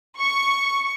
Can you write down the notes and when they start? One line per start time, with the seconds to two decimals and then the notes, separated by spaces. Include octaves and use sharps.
0.18 C#6